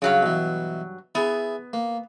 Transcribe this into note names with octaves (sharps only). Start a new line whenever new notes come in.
G2 C#3 F#3 F5
B2 E3
B3 E4 G#4
A#3